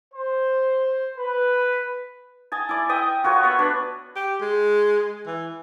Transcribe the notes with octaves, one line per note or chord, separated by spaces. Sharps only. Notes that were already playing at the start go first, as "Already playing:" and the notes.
C5
B4
D#5 G#5 A5
E4 D5
D#5 E5 G5 D#6
F4 F#4 A#4 C#5
B3 E5
D4 B4
G4
G#3
E3